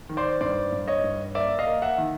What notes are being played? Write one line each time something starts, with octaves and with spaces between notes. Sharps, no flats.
D#3
C5 D5
G2 C5 D5
G2
C#5 D#5
G2
A#3 D5 E5
D#5 F5
A#3
E5 F#5
D#3